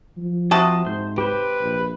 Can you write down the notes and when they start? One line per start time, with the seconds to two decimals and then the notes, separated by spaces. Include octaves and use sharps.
0.17 F3
0.51 C3 F4 F#4 A5 D#6
0.87 G#2 C5
1.18 G4 B4 C5
1.61 A#1